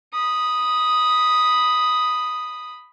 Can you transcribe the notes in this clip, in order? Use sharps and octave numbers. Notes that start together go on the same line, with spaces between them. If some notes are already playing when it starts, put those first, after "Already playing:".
B5 D#6